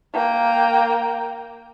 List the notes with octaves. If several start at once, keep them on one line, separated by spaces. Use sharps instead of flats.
A#3 G5